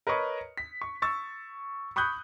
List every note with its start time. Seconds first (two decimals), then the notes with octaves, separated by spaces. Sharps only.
0.07 A#4 B4 C#5 D#5 C#6
0.57 B6
0.82 C#6
1.02 C#6 E6 A6
1.96 B5 C#6 D#6 F#6 G6